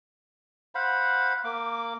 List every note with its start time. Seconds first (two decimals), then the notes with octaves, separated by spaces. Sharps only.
0.75 C5 F5 F#5 B5
1.44 A#3 D6